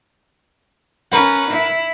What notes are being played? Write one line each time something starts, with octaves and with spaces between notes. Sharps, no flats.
C#4 A#4 B4 F#5
E4